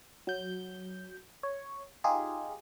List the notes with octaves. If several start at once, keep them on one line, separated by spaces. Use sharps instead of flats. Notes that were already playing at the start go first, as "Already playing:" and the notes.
F#3 G6
C#5
D#4 F4 G4 G#4